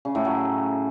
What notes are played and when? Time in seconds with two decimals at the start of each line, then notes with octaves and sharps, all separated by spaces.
0.05 C#3
0.15 A2
0.25 F#3